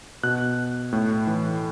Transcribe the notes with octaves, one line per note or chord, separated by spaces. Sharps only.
B2 F#6
A2
E3